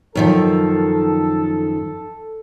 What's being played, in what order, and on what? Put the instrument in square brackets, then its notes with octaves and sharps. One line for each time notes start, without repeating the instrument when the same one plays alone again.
[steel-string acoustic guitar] F#2 D#3 F3 [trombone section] A4